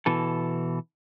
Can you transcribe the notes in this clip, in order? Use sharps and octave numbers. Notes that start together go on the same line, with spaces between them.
B2 E3 A4